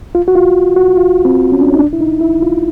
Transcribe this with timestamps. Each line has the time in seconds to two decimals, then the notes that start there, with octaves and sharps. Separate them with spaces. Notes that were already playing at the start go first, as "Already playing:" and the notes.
0.15 F4
0.28 F#4
0.35 F4
0.76 F#4
0.97 F4
1.25 C4
1.52 C#4
1.61 D4
1.69 C#4
1.75 D#4
1.79 D4
1.93 E4
2.01 D#4
2.21 E4
2.42 F4